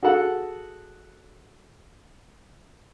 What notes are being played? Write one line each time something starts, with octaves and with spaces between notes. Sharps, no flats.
F#4 G#4 A4 F#5